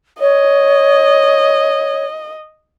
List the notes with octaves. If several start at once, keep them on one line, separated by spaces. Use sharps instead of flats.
C#5 D#5